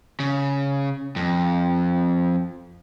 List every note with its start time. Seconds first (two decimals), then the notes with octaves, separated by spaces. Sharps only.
0.20 C#3
1.16 F2